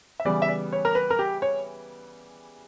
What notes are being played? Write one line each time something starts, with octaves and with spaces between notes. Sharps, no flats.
E5
C#3 E3 G3 B3 D5
E5
D5
C#5
A#4
B4
A#4
G4
C#5